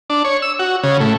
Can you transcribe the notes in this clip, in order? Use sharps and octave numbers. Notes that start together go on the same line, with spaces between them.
D4
C#5
E6
F#4
C#3
A2